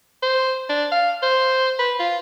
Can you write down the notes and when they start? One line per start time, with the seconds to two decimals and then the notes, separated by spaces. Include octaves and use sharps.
0.22 C5
0.69 D4
0.92 F5
1.22 C5
1.79 B4
1.99 F4